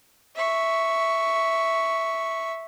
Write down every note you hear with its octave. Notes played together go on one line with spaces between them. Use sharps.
E5 C#6